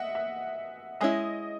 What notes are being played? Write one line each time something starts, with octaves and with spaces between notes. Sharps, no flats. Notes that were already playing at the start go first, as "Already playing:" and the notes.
Already playing: D#5 E5 F#5
E5
G#3 C#4 E4 D#5